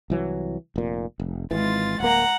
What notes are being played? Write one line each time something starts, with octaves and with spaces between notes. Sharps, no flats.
C2 E3 F#3
F1 A#2
F1
G#1 E3 G#3 F4 A6
D1 A#3 F#5 A#5